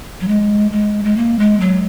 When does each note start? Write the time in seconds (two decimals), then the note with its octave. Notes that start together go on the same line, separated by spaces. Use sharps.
0.21 F#3
0.28 G#3
0.72 G#3
1.04 G#3
1.17 A#3
1.39 G#3
1.60 F#3